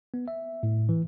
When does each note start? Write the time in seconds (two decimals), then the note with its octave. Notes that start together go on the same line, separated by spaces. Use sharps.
0.14 B3
0.28 E5
0.63 A2
0.89 E3